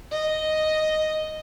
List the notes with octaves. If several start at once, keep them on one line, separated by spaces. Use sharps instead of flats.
D#5